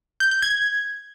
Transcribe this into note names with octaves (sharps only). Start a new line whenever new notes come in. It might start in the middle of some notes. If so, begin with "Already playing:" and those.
G6
G6
G#6